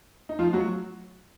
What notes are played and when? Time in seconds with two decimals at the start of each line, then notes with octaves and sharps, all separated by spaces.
0.29 D#4
0.39 F3 F4
0.53 F#3 F#4